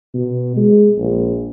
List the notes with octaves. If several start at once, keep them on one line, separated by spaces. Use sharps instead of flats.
B2
G#3
A#1